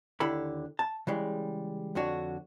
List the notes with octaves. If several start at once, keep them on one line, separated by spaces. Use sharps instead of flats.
D#2 D3 E4 G4 A4 B5
A5
C#3 E3 G3 G#3
F2 D3 D4 F#4 C#5